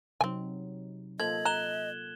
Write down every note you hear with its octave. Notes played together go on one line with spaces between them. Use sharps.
C3 F#3 C4 D#4 G#5
F3 A#3 F4 A4 D#5 G#6 F#7
A#5 F#6 E7 G7